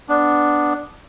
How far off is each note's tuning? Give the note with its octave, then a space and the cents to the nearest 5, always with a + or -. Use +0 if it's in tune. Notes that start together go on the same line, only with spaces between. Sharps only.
B3 +0 D4 +0